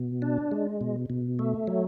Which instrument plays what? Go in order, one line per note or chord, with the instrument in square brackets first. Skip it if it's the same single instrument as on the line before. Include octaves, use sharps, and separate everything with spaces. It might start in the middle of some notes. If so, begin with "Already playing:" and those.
Already playing: [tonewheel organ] B2
D4
G#3
B2
B2
A3
F#3